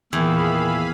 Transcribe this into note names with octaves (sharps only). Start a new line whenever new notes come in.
E2 A#2 D#3 G#4 E5 F5 B5